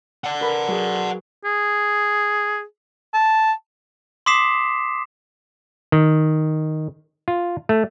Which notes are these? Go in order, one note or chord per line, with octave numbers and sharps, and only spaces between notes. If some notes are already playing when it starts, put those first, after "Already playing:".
D5 F#5
A#4 B4 B5
F#3 G#4
G#4
A5
C6 D6 D#6 B6 C7 E7
D#3
F4
A3